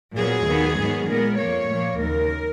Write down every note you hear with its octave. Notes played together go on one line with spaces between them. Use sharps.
A#2 F#3 B3 G#4
D#2 D#3 F#3 B3
G#2 D#3 F#3 B3
A#2 G#3 B3 A#4
F2 F3 A#3 C#5
A#2 F3 A#3
D#2 C#3 F#3 A#4